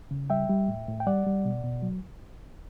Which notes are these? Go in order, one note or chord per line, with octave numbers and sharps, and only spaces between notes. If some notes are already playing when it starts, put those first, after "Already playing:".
C#3
G3 E5 G5
G3
A2
A2
G5
G3 D5 F#5
G3
B2
B2
F#3